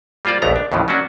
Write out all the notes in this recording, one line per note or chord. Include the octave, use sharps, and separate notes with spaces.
G3 A#3 F4 C5 D5
A#1 D#2 A3 B3 A#5
D4
D#2 A2 C#3 E3 F3
F#3 A#3 C#4 D4 F#4